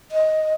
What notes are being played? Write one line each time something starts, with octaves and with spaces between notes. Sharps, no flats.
D#5